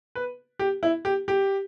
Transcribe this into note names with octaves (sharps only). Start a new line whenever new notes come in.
B4
G4
E4
G4
G4